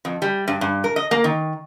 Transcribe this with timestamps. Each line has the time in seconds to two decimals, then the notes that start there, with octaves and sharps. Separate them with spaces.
0.05 F2
0.22 G3
0.48 G2
0.61 G2
0.84 A#4
0.96 D#5
1.11 A#3
1.24 D#3